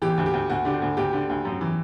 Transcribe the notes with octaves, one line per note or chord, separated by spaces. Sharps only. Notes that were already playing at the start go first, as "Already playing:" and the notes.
E3 G4
D2
G4
D2
D2 F#4
D3 G4
F#4
D2
D2 G4
D3
D2
F#2
E3